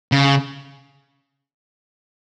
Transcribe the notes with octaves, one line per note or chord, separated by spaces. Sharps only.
C#3